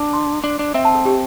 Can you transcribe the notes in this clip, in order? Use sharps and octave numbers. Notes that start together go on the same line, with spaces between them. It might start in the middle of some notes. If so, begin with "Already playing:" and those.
Already playing: D4
C6
D4
D4
C4 E5
A5
A4
G4